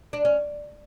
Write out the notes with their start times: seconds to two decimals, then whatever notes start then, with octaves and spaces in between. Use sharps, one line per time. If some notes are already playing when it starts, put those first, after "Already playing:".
0.13 D4
0.25 C#4